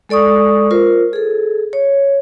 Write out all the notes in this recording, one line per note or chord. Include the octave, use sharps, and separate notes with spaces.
G#3 A4 D5 C#6 D#6
F4 A#4 C5
G#4 A4
C#5